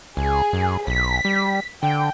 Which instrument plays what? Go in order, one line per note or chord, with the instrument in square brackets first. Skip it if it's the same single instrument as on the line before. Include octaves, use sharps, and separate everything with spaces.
[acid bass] C#2 [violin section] G#4
[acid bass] F#2
[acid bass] B1 [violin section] B6
[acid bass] G3
[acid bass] D3 [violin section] G5